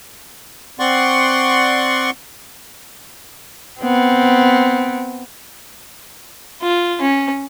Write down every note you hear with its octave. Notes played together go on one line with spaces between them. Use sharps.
C4 D5 F#5 C6 C#6
B3 C4
F4
C#4